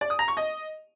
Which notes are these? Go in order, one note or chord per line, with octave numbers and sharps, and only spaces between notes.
D5
D#6
A#5
C#6
D#5